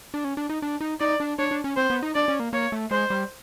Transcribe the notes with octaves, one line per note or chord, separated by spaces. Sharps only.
D4
C#4
D4
D#4
D4
D#4
D#4 D5
D4
D4 C#5
D4
C#4
C4 C5
B3
D#4
D4 D5
C#4
A#3
A#3 C#5
A3
G#3 C5
G3